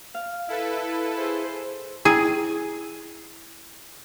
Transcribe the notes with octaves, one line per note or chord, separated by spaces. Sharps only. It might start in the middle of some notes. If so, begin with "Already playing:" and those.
F5
E4 A4 B4
G#4 C5
E4 G#4 G5 E6